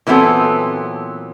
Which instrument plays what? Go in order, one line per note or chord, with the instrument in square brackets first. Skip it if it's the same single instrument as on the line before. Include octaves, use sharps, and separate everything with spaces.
[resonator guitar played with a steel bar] A#2 E3 F#3 B3 C4 A4